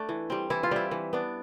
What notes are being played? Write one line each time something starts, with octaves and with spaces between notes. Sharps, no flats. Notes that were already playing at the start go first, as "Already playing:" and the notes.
Already playing: A3 D4
E3
G3 C4
E3 E4
F4
G3 C4 E4
E3
B3 D4